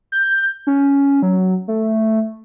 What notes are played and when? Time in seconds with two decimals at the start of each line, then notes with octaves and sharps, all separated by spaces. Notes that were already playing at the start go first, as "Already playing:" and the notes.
0.12 G6
0.67 C#4
1.23 F#3
1.68 A3